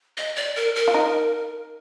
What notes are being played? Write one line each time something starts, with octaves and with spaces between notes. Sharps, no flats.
D#5
D5
A#4
A#4
F4
D#4